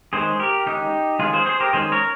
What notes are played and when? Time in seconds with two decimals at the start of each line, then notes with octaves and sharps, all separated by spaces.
0.13 D#3 G#3 C#4 G#4 C5
0.40 G4 A#4
0.66 D#3 G#3 C#4 D#4 G4
1.19 D#3 G#3 C#4 F4 G#4
1.33 G#4 C5
1.46 G#4 C5
1.60 G4 A#4
1.73 D#3 G#3 C#4 G#4 C5
1.92 A#4 C#5